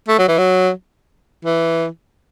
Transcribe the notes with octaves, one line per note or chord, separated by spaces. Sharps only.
A3
F#3
E3
F#3
E3